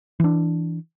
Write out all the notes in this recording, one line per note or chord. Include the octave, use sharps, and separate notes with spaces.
E3 D4